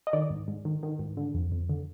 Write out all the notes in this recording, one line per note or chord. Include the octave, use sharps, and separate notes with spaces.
D#5
D#3 D5
G#2
G#2
D#3
D#3
G#2
D3
F2
F2
D3